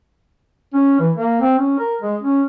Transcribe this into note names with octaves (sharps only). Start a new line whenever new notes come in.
C#4
E3
A#3
C4
C#4
A#4
G#3
C#4